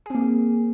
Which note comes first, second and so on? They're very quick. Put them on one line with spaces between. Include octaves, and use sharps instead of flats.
G#4 C4 A#3